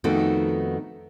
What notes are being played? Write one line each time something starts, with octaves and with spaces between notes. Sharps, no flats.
F2 D#3 A3 B3 D#4 F#4